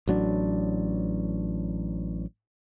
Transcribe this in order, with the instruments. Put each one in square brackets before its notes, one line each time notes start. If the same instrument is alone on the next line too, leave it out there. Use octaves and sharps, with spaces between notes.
[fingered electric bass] A1 F#3 D4